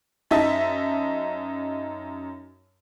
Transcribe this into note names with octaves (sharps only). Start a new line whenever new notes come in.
F#2 D#4 E5 A5